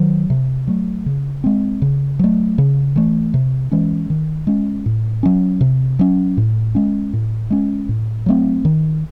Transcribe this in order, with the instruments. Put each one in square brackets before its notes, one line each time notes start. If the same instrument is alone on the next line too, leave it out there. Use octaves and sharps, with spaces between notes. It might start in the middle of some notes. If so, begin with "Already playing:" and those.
Already playing: [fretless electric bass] D#3 F#3
C3
F#3 A3
C#3
G#3 C4
C#3
F#3 A3
C#3
E3 A3
C3
E3 G#3 C#4
D#3
G#3 C#4
A2
F#3 C#4
C3
F#3 C#4
A2
G#3 C#4
A2
G#3 C#4
A2
F#3 A3 C4
D#3